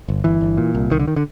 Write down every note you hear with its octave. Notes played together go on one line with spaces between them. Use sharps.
G1
G1 E3
G1
A#2
C2
C2 D#3
D3
D#3
D3